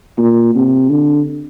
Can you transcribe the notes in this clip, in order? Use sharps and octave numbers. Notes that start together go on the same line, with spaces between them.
A#2
C3
D3